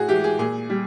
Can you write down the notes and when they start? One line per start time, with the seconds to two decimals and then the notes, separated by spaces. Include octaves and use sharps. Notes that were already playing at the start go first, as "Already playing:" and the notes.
Already playing: A2 F#4 G#4
0.08 E3 G#3 G4
0.24 G#4
0.39 A#2 G#4
0.70 G3